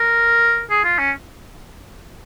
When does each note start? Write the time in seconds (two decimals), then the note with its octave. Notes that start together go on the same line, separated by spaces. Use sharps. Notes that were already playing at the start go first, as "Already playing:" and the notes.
Already playing: A#4
0.70 G#4
0.84 F4
0.98 C#4